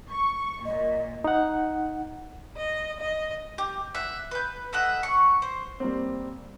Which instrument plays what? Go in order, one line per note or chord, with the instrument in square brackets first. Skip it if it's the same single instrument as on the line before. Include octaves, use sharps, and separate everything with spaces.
[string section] C#6
[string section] A#2 [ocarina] D#5
[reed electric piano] D#4 F#5
[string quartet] D#5
D#5
[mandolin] G4
E5 F#5
B4 G6
A4 D#5 E5 F#5
C#6
C5
[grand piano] G3 A#3 C4